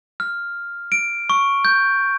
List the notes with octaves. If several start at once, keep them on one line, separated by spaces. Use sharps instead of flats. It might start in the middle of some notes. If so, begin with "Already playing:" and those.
F6
D7
C#6
G6